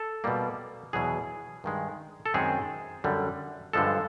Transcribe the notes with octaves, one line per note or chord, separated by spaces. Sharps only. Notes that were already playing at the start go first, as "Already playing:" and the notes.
Already playing: A4
B2 G3 A#3
E2 B2 F#3 G#4
G2 D#3 G#3
A4
F#2 D#3 G#3 C4 G#4
F#2 D3 G3
G2 D3 F3 G#3 A4